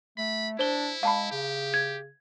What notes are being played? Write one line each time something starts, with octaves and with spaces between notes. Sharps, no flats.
A3 B5
D4 E4 C5 G7
G#3 F5 A5 B5
C#3 G4
G#6